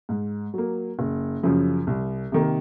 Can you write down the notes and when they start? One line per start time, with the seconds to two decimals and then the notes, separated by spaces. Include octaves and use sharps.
0.09 G#2
0.54 F#3 A#3
0.99 F#1
1.43 F#2 C#3 F3
1.87 C2
2.32 C3 D#3 A#3